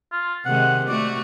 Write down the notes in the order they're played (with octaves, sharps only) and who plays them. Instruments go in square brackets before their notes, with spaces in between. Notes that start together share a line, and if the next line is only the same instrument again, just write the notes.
[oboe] F4
[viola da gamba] C3 D#3 G#3 [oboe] F#5
[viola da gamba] A3 F#4 [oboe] D5